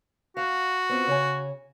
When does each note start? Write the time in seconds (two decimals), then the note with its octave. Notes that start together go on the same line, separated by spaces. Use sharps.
0.37 F#4 F5
0.89 B3 C4 F4
1.07 C#3 C#5 G#5